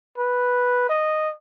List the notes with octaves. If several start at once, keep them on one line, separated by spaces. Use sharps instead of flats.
B4
D#5